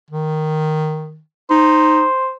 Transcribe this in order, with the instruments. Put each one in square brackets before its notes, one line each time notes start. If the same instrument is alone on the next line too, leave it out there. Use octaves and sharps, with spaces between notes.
[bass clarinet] D#3
[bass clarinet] D#4 [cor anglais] C5